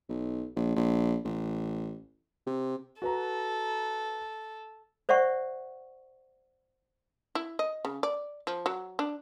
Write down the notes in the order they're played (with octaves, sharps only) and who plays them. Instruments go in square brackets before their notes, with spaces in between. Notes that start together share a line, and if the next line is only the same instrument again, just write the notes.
[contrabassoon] B1
A#1
A#1
A1
C3
[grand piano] F#4 B4 A#5 [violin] A4
[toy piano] C5 D5 E5 F#5 C#6
[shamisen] E4
D#5
C#3
D5
F3
F#3
D4